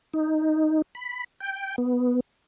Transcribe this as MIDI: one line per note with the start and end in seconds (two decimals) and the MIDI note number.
0.14 0.82 63
0.95 1.24 83
1.41 1.76 79
1.78 2.20 59